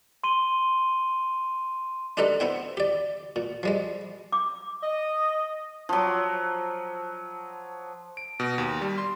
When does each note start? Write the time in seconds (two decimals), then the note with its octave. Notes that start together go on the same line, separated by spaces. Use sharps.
0.24 C6 D#7 G7
2.17 D4 D#4 G4 A4 B4 D5
2.40 B3 C4 E4 G5
2.77 G4 D5
3.36 A#2
3.63 F3 G3 G#3
4.32 D6
4.83 D#5
5.89 F3 F#3
8.17 D7
8.40 B2
8.58 D#2
8.81 G3
8.98 C6